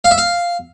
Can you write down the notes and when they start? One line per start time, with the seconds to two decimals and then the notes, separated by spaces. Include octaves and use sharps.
0.04 F5
0.11 E5
0.18 F5